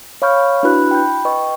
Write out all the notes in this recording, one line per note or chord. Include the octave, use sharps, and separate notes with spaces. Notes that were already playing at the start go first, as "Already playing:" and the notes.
C#5 F5 B5 C#6 F6 G6
D4 E4 F#4 B4 B5 F#6
G5 B5 G6
B4 D#5 G5 C#6